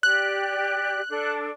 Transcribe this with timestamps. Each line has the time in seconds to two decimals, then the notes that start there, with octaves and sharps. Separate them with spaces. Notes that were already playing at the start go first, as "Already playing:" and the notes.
0.03 G4 D5 F#6
1.09 D4 A4